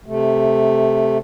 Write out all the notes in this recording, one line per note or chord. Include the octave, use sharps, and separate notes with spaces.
C3 A3